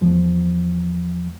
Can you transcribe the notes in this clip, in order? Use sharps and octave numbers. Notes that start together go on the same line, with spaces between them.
E2 F3